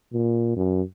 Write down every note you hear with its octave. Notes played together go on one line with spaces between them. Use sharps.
A#2
F#2